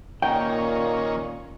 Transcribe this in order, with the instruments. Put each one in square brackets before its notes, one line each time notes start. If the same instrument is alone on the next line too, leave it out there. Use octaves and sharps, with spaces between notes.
[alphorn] A#2 [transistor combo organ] D#3 A#3 C#4 [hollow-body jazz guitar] G5